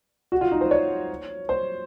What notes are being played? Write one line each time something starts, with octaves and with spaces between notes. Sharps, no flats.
F#4
F4
D#4
C5
C#5
C5